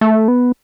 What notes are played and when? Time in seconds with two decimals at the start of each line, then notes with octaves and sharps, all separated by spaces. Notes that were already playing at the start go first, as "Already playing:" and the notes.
0.01 A3
0.28 B3